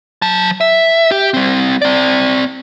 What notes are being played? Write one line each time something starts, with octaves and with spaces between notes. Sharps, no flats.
F#3 A5
E5
G4
G3 C4
C4 D5